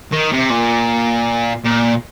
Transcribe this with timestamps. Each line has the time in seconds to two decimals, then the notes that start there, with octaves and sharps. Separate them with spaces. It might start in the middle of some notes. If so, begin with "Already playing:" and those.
0.13 D#3
0.33 C3
0.50 A#2
1.65 A#2